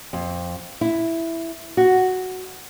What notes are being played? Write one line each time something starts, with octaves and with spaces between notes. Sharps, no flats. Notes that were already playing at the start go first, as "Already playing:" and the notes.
F2
E4
F#4